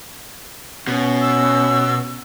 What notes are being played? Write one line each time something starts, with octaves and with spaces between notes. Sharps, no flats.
B2 C#4
E6